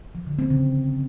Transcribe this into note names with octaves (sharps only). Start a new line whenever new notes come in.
F3
D3
C4
C#3